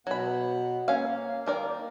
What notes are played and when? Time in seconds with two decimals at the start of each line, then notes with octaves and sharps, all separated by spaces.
0.07 B2 F#3 B3 F#5 B5
0.88 A#3 C#4 F5
1.46 D#3 A#4 D5